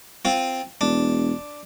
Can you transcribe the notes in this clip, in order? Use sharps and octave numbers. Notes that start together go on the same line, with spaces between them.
C4 F4
E1 D4